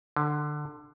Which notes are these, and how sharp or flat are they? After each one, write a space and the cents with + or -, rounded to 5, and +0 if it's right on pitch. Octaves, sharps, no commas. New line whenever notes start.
D3 +20